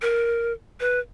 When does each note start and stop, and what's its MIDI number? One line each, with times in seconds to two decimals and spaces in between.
0.02 0.52 70
0.80 0.99 71